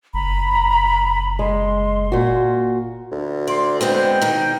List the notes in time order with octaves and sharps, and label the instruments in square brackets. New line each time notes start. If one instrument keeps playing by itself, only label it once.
[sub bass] F#1 [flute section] A#5 B5
[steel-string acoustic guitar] G#3 [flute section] C6
[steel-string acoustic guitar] A#2 F#4
[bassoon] D2
[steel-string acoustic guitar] D5 [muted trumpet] C6
[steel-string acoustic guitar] G#3 B3 C4 [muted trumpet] G5
[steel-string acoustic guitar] B2 D#3